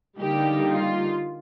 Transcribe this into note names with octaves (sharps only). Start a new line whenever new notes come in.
D3 G3 A#3 D#4 G4
F4